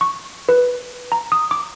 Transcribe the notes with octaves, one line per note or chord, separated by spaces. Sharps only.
C#6
B4
A#5
D#6
D6